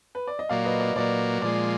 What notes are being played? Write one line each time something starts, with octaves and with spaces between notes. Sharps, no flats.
B4
D5
D#5
A#2 F#3 A#3 D5 F5
B4 D#5
D5
A#2 F#3 A#3 D5
A#2 F3 G#3 D5